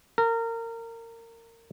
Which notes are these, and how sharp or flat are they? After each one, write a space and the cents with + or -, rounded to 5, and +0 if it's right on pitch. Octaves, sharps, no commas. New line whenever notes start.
A#4 -25